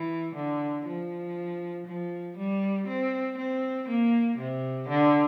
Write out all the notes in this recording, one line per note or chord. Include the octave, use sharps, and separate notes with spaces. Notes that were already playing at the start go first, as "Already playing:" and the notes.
Already playing: E3
D3
F3
F3
G3
C4
C4
A#3
C3
D3